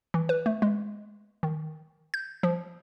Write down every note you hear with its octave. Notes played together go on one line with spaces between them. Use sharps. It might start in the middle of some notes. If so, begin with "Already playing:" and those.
E3
B4
A3
G#3
D#3
G6
F3